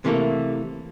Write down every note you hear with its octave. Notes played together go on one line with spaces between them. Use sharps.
C3 E3 A3 A#3